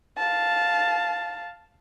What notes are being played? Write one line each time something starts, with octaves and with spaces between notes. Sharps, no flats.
F5 A5